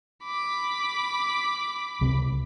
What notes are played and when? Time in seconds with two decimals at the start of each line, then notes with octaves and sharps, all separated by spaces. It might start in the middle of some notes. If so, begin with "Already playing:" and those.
0.24 B5 D6
2.01 C#2 C3